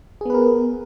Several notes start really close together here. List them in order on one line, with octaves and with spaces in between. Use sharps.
G#4 B3 B4 A#4